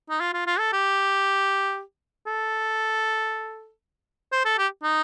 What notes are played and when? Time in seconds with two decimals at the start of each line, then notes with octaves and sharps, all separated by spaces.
0.10 D#4
0.20 F4
0.34 F4
0.47 F4
0.59 A4
0.73 G4
2.27 A4
4.32 C5
4.45 A4
4.58 G4
4.83 D#4